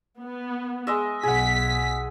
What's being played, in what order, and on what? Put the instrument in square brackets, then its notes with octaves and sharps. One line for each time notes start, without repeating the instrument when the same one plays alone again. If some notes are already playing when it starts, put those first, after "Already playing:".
[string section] B3
[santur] G#3 D#5 E5
[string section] B1 B6 [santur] G#4 F#5